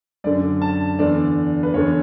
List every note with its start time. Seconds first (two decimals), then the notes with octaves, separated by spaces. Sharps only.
0.24 F#2 D3 D5
0.62 A5
0.99 E2 D3 D5
1.63 B4
1.74 E2 D3 C#5